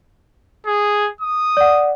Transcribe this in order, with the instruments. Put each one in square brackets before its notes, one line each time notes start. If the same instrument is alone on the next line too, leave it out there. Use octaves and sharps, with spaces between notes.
[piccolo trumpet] G#4
D#6
[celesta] D5 F#5